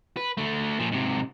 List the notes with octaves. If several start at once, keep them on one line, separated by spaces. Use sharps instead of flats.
B4
D3 A3
A#2 F3
G#2 C3